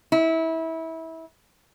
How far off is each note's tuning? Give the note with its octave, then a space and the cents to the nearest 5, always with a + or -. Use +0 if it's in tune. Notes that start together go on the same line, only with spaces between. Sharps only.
E4 -25